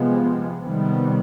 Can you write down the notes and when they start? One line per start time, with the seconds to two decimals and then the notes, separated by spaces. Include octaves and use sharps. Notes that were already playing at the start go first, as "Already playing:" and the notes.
Already playing: C3 F3 G#3 B3
0.62 C3 D#3 G3 B3